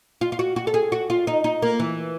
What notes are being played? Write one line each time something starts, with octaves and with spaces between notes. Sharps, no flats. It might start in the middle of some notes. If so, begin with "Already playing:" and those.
F4
F4
F#4
F#4
A4
G#4
F#4
F4
D#4
D#4
A#3
E3